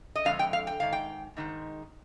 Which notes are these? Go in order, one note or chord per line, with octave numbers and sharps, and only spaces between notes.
D#5
F2 D3 G#3 F5
G5
F5
G5
G#2 D#3 F5
G5
G#2 D#3 G#3